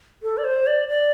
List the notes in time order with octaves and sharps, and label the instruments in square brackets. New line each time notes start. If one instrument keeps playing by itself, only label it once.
[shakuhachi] A4
D5
C5
D5
D5